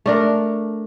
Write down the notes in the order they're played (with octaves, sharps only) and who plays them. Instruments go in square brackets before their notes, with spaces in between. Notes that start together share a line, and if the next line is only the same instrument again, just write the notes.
[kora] A3 D4 A#4